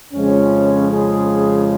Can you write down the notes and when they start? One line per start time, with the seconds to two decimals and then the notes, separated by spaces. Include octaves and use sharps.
0.14 F2 C#3 F3 G#3 C#4
0.91 G#4